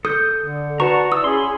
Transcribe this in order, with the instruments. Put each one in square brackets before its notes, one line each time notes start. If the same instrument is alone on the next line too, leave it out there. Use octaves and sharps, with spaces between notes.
[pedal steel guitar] A4 G6 [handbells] D#6
[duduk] D3
[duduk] F#4 [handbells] B4 C#6 [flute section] D5 [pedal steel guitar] F#5 A5 A#5
[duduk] E4 [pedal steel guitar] D#6 [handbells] E6
[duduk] C#4 [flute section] G#4 C#5 G#5 [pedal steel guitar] B5 C6